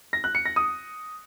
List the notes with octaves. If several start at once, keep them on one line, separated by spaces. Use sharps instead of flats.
A#6
F#6
C#7
A#6
D#6